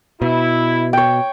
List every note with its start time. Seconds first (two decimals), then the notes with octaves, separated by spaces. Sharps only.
0.22 B2 E4
0.93 C#5 G5